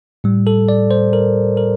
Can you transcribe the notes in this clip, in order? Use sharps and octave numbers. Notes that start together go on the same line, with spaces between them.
A2 G3
A4
D5
C5
A#4
A#4